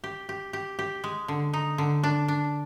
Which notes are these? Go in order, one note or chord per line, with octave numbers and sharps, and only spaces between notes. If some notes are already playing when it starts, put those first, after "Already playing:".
G4
G4
G4
G4
G#3
D3
D#4
D3
D4
D4